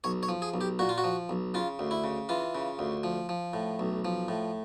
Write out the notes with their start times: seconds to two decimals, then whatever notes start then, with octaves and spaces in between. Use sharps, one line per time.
0.04 B1 C#5
0.23 C#5
0.29 F3
0.42 G#4
0.54 B1
0.61 G4
0.79 A#2 F#4
0.89 F4
0.98 F#4
1.04 F3
1.29 B1
1.54 C#3 F4
1.79 D2
1.91 E4
2.04 C#3
2.29 E3 F4
2.55 C#3
2.79 D2
3.03 F3
3.29 F3
3.53 A2
3.79 B1
4.05 F3
4.28 A2